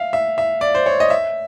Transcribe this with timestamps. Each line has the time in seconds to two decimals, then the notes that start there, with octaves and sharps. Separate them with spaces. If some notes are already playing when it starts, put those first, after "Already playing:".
Already playing: E5 F5
0.13 E5
0.38 E5
0.61 D5
0.75 C5
0.86 C#5
1.00 D#5
1.10 E5